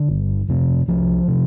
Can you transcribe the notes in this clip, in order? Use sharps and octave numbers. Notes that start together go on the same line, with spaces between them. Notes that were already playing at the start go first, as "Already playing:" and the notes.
Already playing: D3
G1
F2 C3
C2 F3
C3